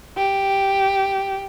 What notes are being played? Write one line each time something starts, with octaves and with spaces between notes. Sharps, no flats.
G4